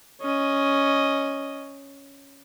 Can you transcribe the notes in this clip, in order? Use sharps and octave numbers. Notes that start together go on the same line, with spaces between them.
C#4 D#5